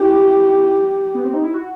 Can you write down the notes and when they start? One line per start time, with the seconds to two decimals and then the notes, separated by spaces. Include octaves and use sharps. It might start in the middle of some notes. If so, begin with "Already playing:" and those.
Already playing: E4 G4
1.14 B3
1.24 C4
1.34 D#4
1.43 E4
1.54 F#4